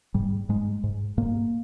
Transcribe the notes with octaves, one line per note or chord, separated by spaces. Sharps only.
G#2 G3
G#2 G#3
G#2
G#2 A#3